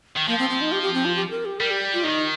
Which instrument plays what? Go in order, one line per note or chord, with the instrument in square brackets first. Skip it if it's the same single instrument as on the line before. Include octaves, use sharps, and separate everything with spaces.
[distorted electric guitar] D#3
[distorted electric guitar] F3 [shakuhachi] A#3
[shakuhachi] C4
C4
D#4
G4
G4
C4
F4
G4
A#4
G4
[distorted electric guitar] G3 [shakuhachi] A#4
[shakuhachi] G4
F4
[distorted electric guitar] D#3 [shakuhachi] D#4